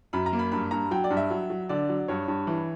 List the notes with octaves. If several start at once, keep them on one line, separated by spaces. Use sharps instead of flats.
F#2 B5
A#5
A#3
B5
G2 B5
G2 A#5
F#3 G5
D5
G2
E5
F#3
F#3
D3 D5
F#3
G2 C#5
G2
E3